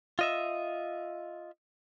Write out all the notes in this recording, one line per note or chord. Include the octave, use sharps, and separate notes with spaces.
F4 D#5 E5